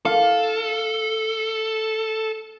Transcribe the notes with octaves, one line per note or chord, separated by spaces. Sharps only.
A4 F5